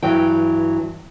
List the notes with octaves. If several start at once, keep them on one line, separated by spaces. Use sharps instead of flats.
G2 E3 F#3 G5